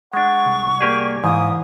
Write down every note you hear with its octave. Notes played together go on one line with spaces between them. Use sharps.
G#3 D4 F#5 C#6
C2
A#3 G4 G#4 D5
G#2 E3 F5 D#6